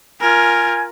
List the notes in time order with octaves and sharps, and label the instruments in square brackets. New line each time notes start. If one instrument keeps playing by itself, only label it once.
[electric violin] F4 A#4 [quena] G#5